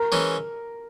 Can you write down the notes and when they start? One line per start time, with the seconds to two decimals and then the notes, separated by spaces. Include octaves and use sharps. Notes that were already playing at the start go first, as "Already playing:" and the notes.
Already playing: A#4
0.12 E3 G#3 C#4